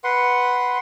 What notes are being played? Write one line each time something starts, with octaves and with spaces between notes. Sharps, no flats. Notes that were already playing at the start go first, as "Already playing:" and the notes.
B4 F#5 C6